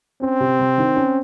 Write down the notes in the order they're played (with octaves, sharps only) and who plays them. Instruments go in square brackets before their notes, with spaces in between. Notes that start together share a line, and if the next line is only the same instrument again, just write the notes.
[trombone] C4 [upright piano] C#4
[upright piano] C3
C3
D#3
C#4